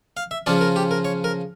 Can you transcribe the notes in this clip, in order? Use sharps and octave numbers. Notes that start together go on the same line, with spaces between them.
F5
E5
C#3 F3 C#4 F4 D5
A#4
G4
A#4
C#5
A#4